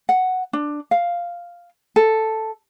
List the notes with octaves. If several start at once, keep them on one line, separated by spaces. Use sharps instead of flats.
F#5
D4
F5
A4